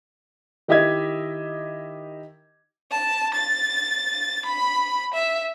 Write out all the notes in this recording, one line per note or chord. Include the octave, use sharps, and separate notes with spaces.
D#3 E4 G4 D#5 E5 G#6
A5
A6
B5
E5